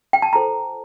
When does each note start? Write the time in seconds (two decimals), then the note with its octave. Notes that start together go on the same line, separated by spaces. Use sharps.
0.13 G5
0.22 A5
0.33 F4 A4 C5 A#5